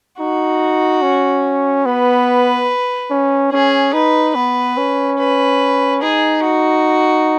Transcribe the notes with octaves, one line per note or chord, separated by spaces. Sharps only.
D#4 F#4
C#4
B3 B4
C#4
C#4 G#4
D#4 B4
B3 B4
C#4
B4
D#4 G#4
F#4